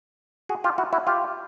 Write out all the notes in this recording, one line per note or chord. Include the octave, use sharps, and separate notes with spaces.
F#4 G#4
F4 G4
E4 F#4
E4 F#4
F4 G4